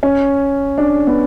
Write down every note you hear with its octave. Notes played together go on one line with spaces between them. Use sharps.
C#4
D4
B3